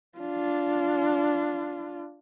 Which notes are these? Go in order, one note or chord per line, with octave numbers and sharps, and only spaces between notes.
D4 F4